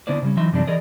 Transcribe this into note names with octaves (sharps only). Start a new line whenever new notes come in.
D3 B3 D4 E4 C5 D5
C#3 G3 C#4
E3 F#3 D#4 E5 C6
F#2 C3 D#3 E3 G3 D4
E3 G#4 A#4 D5 D#5